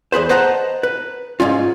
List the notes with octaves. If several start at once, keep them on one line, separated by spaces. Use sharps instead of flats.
E2 G#4 B4 C5
B4 C5 D#5 F#5 A5 A#5
B4
G#2 E3 C#4 F4